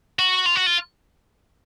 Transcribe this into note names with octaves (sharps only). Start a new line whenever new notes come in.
F#4
F4
F#4
F4